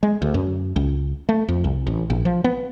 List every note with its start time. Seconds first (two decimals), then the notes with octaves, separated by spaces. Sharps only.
0.03 G#3
0.22 D2
0.34 F#2
0.76 C#2
1.29 A3
1.48 F2
1.64 C2
1.87 A1
2.10 A#1
2.25 F3
2.44 B3